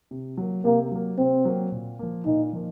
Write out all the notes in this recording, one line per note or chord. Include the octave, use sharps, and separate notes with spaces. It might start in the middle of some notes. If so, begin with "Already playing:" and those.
C3
F#3 A#3
C3 A#3
F#3 A#3
C3 C4
F#3 A#3
A#2
F3 A#3
A#2 D#4
F3 A#3